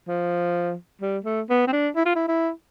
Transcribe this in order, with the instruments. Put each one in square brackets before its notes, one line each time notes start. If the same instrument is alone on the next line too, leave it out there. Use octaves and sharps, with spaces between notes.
[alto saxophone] F3
G3
A3
B3
C4
D4
E4
F4
E4
E4